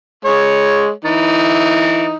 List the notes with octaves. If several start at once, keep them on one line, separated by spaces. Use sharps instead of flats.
G#3 C#5
E3 D#4